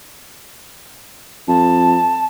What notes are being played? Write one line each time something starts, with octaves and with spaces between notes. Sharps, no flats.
F2 A5